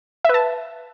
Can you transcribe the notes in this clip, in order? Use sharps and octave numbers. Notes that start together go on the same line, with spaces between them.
B4 E5 A5